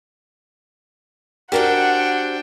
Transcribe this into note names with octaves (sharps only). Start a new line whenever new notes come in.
G3 D4 F#4 G4 A#4 C5 F#5 G5